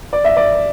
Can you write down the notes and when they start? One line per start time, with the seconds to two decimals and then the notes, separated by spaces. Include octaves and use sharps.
0.13 D5
0.24 E5
0.36 D5